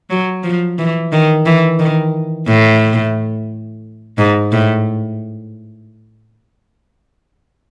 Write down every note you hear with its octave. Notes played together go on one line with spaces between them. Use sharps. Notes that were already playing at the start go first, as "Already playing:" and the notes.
F#3
F3
E3
D#3
E3
D#3
A2
G#2
A2